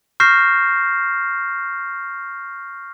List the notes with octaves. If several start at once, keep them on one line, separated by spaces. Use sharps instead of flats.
C#6 F6 G6 A#6 C7 E7